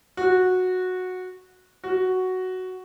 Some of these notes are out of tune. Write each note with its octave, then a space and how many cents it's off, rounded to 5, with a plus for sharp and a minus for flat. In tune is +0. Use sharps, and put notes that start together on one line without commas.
F#4 -10
F#4 +5